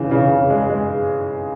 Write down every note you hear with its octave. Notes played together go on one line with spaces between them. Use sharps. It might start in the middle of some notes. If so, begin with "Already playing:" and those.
Already playing: C#3 E3 G#3
C#3
C#3
G#3
G#3